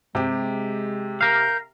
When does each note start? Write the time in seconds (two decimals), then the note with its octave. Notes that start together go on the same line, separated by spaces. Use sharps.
0.15 C3 G#3 G4
1.21 A#4 F5 G6